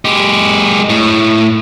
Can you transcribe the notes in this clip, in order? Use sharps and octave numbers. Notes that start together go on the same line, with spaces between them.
G#3 G4
A2